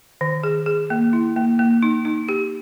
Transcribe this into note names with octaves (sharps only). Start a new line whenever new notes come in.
D#3
G#4
G#4
A#3
E4
A#3
A#3
D#4
D#4
G4